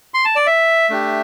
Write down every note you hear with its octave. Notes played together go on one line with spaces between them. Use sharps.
C6
A5
D5
E5
A3 D4 G4